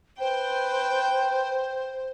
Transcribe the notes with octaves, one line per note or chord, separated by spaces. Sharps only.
B4 C5 G5